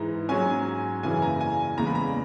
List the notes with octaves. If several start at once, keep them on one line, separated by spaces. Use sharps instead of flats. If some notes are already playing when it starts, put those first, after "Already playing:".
Already playing: G#2 E3 G#3 D#4 A#5
G#2 F#3 C#4 G#5
F#2 C#3 E3 G#5
A#5
G#5
E2 C#3 G#3 A#5
B5
A#5